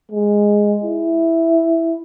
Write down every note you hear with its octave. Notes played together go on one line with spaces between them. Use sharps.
G#3
E4